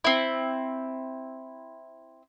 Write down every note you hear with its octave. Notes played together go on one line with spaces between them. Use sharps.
C4 E4